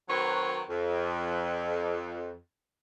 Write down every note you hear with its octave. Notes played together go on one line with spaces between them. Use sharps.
D#3 F#3 C4 F#4 B4 C#5
F2